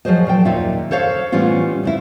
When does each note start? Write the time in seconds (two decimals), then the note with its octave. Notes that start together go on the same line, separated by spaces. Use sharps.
0.05 F3 F#3 G#4 C5 D#5
0.27 A#2 A4 G5
0.45 D#2 A#2 D#4 F4 E5
0.91 A4 C5 C#5 F5
1.32 A2 E3 G3 B3 C#4 F4
1.83 C#3 C4 E4